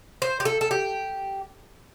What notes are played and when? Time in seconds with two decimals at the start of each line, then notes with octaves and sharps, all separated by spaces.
0.22 C5
0.40 G4
0.45 A4
0.61 A4
0.71 G4